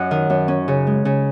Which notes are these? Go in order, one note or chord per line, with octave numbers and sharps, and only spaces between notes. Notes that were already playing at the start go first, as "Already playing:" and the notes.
Already playing: F#2 D#5 F#5
D#3
F#2
C#4
C#3
G#3
C#3